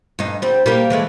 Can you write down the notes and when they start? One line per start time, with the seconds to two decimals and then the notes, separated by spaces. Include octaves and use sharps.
0.19 G2 D#4
0.42 G3 C4
0.66 G3 A#3 G4
0.90 E3 G#3 A3